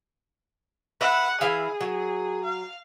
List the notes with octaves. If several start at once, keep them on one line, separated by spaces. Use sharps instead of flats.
B4 E5 F#5
E3 E4 G#4 F5
F#3
F5